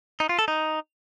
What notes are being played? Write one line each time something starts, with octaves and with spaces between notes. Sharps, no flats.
D#4
F4
A4
D#4